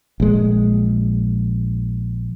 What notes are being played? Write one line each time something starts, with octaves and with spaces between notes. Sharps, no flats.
A#1 G#3